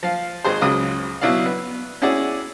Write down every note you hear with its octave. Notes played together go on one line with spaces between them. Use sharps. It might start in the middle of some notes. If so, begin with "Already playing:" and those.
F3 F5
G#1 G#4 C5
C#2 C#3 F#3 D#6
B2 F#3 E4 D5 F5
B3
C#4 E4 F#4 G#4 D5